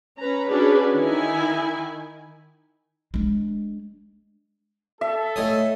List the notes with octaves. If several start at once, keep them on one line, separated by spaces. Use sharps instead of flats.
C#4 B4 A#5
C#4 D4 F#4 G#4 B4
D#3 D#4 E4 G#5
G#3 D4
A4 E5
A2 C#5 D#5 G#5 D#6